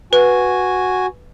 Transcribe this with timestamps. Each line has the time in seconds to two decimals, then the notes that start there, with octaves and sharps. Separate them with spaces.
0.13 F#4 B4 G#5